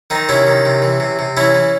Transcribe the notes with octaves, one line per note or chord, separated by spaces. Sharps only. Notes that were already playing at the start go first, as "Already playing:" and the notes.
D#3 C4 D#4
C3 C#4 E4
D#3
C3
E3
C3
C3
E3 C#4 E4
E3